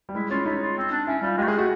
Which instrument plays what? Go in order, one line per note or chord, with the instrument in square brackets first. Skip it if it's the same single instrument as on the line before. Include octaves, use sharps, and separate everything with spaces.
[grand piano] G3
[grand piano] G#3 [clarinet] E4
[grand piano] C#4 [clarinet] F4
[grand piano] D#4 [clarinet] E4
[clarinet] F4
C4
D4
[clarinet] C#4 [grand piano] E4
[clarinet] G3 [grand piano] F4
[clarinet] G#3 [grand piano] G4
[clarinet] A3
[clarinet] G#3 [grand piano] G#4
[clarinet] A3 [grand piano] F#4